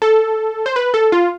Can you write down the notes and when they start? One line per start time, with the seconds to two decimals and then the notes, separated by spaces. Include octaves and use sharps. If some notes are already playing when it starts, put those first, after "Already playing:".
0.02 A4
0.66 C5
0.76 B4
0.94 A4
1.12 F4